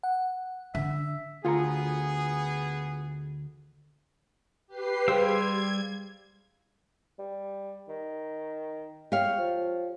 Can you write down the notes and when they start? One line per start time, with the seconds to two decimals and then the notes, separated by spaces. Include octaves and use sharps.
0.03 F#5
0.75 D3 E5
1.45 D2 B3 F4 G#4 A4 A#5
4.67 G4 B4 C7
5.08 G3 G4 G#4 C5 F5 C6 E6 G#6
7.19 G3
7.89 D#3
9.12 G4 C#5 F5
9.38 F3